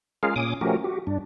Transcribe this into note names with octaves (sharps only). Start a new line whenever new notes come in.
G#3 C#4 F4 G#4 A#4 F5
A#2 C#4 D6 D#6
F3 A3 C#4 F#4 G4 A#4
F#4 G4
G2 D4